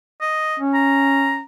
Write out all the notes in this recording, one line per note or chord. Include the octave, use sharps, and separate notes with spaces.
D#5
C#4
A#5